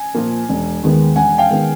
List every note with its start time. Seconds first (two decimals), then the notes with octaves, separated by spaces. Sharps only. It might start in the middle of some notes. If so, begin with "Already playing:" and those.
Already playing: G#5
0.15 A#2 F3 A#3
0.49 E1
0.83 D#2 D#3 G#3 B3
1.16 E1 F#5 G#5
1.38 F5 G5
1.50 D#3 G#3 B3